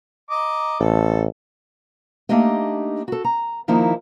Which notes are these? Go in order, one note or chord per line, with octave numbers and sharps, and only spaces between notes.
D#5 A#5 D6
A1 A4
A3 A#3 D4 D#4 G4 D#5
F#4 A4
A#5
D#3 F3 A#3 D#4 E4